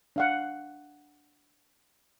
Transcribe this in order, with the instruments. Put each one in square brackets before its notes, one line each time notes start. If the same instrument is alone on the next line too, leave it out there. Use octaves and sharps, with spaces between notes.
[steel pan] D4 F5 F#5